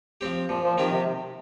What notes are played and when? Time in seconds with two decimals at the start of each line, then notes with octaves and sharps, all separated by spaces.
0.21 F3 C4 G4
0.49 A#2 F3
0.63 F3
0.78 D#3 F3 C4 G4
0.92 C3